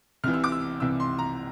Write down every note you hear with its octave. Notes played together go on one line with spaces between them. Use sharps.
C2 C3 E3 F6
E6
D6
E6
C2 C3 E3 E6
C6
A#5